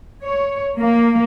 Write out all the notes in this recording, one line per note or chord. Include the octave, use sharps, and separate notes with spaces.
C#5
A#3